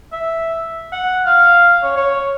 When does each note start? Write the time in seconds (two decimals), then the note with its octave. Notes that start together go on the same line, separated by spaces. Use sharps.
0.13 E5
0.92 F#5
1.25 F5
1.83 C#5
1.97 C#5